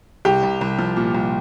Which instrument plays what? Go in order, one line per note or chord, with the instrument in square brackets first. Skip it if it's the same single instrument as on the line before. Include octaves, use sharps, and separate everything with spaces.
[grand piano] C2 [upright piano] G4
[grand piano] C2
C2
F3
A#2
C2